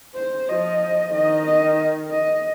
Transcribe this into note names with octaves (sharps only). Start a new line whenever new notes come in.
C5
F3 D#5
D#3 D#5
D#5
D#5